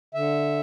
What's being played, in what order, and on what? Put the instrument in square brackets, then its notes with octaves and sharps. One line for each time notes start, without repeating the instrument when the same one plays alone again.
[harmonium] D3 E5